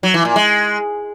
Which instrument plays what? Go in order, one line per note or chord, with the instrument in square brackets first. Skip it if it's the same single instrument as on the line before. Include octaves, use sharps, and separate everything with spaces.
[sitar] F#3
E3
A#2
G#3